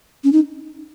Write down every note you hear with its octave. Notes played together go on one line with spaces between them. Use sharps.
C#4
D#4